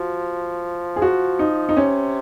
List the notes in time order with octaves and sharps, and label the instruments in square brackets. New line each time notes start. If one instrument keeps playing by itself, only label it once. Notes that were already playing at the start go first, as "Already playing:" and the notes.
Already playing: [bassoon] F3 [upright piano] F#4
[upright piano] G#4
F#4
D#4
D#4
[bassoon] C3 [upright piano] C#4